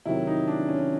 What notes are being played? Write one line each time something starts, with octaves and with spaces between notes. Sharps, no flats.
C3 D#3 F#3 E4
D#4
D4
C#4